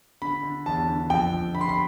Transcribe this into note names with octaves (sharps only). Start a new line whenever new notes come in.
D3 B5
D3
E2 A5
D3
F2 G5
F2
D3 B5
C6
B5